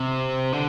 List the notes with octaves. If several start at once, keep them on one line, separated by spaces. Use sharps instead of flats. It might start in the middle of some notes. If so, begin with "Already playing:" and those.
Already playing: C3
D3